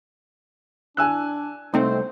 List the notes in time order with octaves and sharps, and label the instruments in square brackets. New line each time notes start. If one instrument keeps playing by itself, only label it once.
[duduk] D4 [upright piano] G#5 E6 F#6
[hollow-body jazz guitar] C2 A3 [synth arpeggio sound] C4 D#4 [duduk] C5